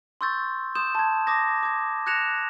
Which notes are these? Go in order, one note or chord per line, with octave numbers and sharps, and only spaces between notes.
C6 C#6 E6 G6 A6
C6 D#6 G6 E7
A5 G#6
D6 D#6 G#6 A#6
D6 G#6
F#6 G#6 A#6 C#7 E7 F7